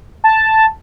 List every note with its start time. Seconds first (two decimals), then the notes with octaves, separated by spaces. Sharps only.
0.24 A5